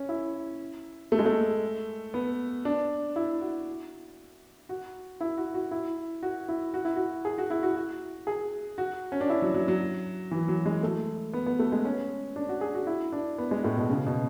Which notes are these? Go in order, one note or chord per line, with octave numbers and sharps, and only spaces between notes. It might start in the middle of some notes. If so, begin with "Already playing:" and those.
Already playing: C#4
E4
A3
G#3
A3
B3
D4
E4
F#4
F#4
E4
F#4
F#4
E4
F#4
E4
F#4
E4
F#4
G#4
F#4
E4
F#4
F#4
G#4
F#4
C#4
D4
E4
F#3
F#3
F#3
E3
F#3
G#3
A3
B3
B3
A3
G#3
C#4
D4
F#4
G#4
F#4
E4
D4
B3
G#3
A2
B2
C#3
B2